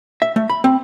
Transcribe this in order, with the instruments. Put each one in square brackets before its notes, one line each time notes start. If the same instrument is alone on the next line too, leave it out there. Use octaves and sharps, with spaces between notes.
[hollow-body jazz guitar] E5
A3
B5
C4